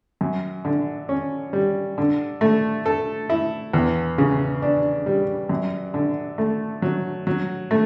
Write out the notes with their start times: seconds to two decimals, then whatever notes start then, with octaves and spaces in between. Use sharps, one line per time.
0.21 F#2
0.65 D3
1.09 C#4
1.53 G3
1.98 D3
2.41 A3
2.86 A4
3.30 E4
3.73 E2
4.18 C#3
4.62 D4
5.06 G3
5.49 F#2
5.94 D3
6.38 A3
6.82 F#3
7.27 F#3
7.71 A3